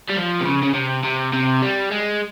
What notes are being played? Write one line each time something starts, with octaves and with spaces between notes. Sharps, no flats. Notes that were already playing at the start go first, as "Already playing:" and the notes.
G3
F3
C3
C#3
C#3
C3
C3
C3
G3
G#3